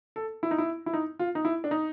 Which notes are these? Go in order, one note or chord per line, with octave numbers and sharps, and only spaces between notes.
A4
E4
D#4
E4
E4
D#4
F4
D#4
E4
D4
D#4